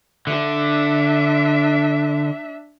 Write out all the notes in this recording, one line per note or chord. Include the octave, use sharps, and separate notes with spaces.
D3 D4 E5